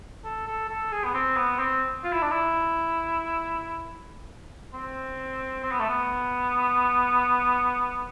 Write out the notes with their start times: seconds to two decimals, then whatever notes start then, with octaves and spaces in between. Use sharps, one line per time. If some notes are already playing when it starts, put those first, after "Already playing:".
0.24 A4
0.47 A4
0.69 A4
0.92 G#4
1.04 B3
1.14 C4
1.36 B3
1.59 C4
2.04 F4
2.12 E4
2.22 D4
2.31 E4
4.73 C4
5.63 C4
5.72 B3
5.80 A3
5.89 B3